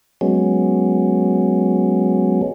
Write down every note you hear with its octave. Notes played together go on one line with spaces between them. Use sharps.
F#3 G#3 B3 C#4